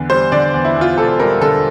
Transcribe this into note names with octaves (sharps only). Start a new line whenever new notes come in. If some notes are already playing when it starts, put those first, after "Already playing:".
Already playing: E2 D3
G3 C5
D3 D5
E2
E4
E2
F4
E1 A4
G3 A#4
D3 A4